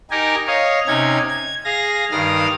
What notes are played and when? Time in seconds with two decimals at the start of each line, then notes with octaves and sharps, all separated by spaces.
0.11 D#4 G4 A#4 D#5 G#5
0.47 C#5 D#5 F5
0.87 C3 C#4 D#4 G#6
1.29 G#6
1.65 G#4 F5 A#6
2.11 G2 D#3 F5 D#6 F6